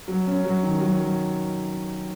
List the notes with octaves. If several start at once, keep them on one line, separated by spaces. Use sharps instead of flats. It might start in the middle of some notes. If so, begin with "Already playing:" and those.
F#3
C#4
F#3
D#3
F#3
F#3